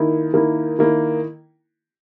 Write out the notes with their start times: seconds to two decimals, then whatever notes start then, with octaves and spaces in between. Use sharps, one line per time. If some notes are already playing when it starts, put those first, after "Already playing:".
Already playing: D#3 A#3 E4
0.33 D#3 A#3 E4
0.79 D#3 A#3 E4